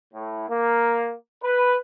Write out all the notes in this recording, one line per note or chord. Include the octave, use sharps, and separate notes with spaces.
A2
A#3
B4